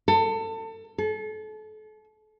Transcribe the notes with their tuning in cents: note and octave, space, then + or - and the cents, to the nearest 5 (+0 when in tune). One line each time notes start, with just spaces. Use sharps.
A4 +30
A4 -35